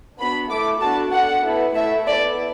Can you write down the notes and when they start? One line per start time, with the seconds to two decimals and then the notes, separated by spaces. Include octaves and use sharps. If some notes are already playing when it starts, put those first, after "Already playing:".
0.19 B3 D4 F#4 B5
0.50 A3 E4 A4 D6
0.81 B3 D4 F#4 A4 A5
1.13 D4 A4 F#5
1.44 B3 E4 A4
1.75 A3 E4 A4 E5
2.06 B3 E4 A4 D5